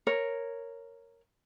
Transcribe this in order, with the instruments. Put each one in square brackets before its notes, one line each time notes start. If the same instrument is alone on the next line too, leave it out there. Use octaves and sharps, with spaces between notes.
[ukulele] A#4 C#5